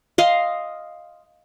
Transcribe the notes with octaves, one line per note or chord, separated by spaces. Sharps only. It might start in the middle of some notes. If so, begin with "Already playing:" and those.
D#5 F5 C6